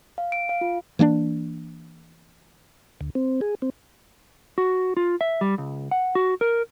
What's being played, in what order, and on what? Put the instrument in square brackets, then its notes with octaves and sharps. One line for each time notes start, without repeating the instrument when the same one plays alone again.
[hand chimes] F5
D7
F5
F4
[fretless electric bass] E3 A#3 C#4 D4
[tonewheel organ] D2
C4
G#4
C4
[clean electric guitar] F#4
F4
E5
G3
C#2
F#5
F#4
A#4